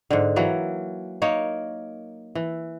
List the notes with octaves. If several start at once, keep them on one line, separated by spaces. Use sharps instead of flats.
G#2 D3
E3 F#3 A#3
A#3 D#4 C#5
E3